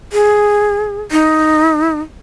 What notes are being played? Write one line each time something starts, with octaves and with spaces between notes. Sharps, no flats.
G#4
D#4